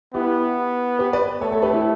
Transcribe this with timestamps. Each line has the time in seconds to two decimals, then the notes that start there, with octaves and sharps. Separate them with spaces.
0.14 B3 E4 G4
0.99 G4 B4
1.13 B4 D5
1.41 A3 A4 C#5
1.52 A4 C#5
1.62 G4 B4
1.73 E4 G4